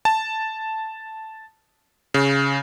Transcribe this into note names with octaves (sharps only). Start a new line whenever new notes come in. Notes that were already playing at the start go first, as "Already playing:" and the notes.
A5
C#3